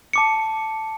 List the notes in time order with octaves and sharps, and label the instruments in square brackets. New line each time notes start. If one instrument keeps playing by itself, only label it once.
[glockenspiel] A5 D6 C#7